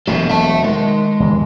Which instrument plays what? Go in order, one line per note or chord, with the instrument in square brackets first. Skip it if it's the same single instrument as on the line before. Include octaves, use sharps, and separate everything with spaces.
[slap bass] E1 F#3 [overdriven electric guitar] A#3 A4
[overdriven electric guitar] E5 A5
[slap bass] D#3 [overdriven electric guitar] G#3
[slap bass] D#2 C#3